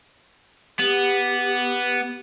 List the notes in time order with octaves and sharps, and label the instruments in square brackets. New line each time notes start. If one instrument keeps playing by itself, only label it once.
[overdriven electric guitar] B3 [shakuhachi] G4